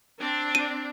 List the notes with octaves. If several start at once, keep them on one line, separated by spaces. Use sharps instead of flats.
C4 D4
D#7